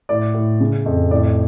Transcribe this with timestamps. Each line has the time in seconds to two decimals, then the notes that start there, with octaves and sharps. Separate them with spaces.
0.09 A2 D5
0.35 A2
0.61 C#3
0.86 F2
1.11 A2 D5